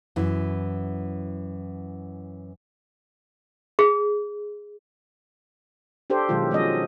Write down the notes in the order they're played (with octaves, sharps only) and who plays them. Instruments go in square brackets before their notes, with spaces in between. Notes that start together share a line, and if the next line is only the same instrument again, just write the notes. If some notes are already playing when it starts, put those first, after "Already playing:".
[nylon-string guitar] F#2 E3
[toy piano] G#4
[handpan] D4 G4 A4 C5
B2 D#3 F#3 G#3 F4
F3 G#3 C#4 D#5